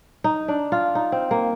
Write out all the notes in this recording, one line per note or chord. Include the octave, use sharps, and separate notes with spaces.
D#4
D4
F4
D#4
C4
A#3